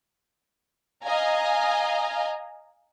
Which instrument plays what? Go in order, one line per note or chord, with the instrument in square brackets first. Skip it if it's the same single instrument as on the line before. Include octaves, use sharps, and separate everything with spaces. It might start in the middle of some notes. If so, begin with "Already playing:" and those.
[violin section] D#5 F5 G#5 A#5